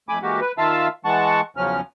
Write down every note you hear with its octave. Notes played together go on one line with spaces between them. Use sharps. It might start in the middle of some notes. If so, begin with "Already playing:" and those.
F2 A3 G#5 B5 D6
E3 G#3 A#3 F#4 G4
B4
D#3 F4 E5 F5 A5 E6
E3 G#3 F#5 A5 C#6
E2 C#3 F3 F#3 C#4 F6